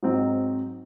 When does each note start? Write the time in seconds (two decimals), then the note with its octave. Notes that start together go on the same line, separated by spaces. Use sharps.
0.03 G#2 F#3 C4 D#4